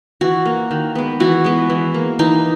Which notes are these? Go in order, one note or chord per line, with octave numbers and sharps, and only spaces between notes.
E3 F#4
A#3
D#3
G#3 B3
E3 F#4
G#3 B3
E3
A#3
E3 D#4